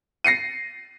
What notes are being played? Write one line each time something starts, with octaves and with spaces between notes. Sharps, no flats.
A#6 C7 C#7 D#7